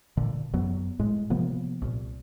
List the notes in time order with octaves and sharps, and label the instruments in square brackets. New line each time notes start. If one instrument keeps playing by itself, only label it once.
[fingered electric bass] A#2 D3
F#2 F#3 B3
A2 G#3
C3 F3 A#3 B3
C2 A#2